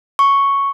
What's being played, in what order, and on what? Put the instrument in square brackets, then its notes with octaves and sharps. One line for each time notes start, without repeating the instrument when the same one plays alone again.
[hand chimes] C#6